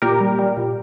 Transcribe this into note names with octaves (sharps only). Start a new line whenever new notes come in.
A#2 G4 A#4
G3
G3
A#2